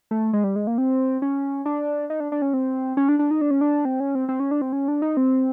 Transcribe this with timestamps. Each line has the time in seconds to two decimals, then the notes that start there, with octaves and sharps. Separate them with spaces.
0.11 A3
0.33 G#3
0.44 G3
0.56 G#3
0.67 A#3
0.78 C4
1.22 C#4
1.65 D4
2.10 D#4
2.20 D4
2.32 D4
2.42 C#4
2.53 C4
2.97 C#4
3.09 D4
3.19 D4
3.31 D#4
3.41 D4
3.51 C#4
3.61 D4
3.85 C4
4.00 C#4
4.15 C4
4.29 C4
4.40 C#4
4.51 D4
4.62 C4
4.72 C#4
4.88 D4
5.02 D#4
5.17 C4